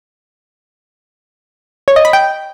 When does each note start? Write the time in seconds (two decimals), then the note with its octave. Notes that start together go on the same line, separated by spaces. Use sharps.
1.88 C#5
1.96 D#5
2.05 B5
2.13 G5